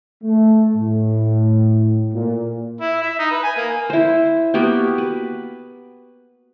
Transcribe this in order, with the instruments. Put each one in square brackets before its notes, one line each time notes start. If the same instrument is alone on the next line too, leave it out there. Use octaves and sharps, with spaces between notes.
[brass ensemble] A3
A2
A#2
[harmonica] E4
E5
D#4
B4
G#5
A#3
[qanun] E4 C5
A#3 B3 F#4 G4
B4